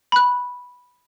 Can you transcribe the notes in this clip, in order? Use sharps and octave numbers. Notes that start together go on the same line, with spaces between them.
B5 F#6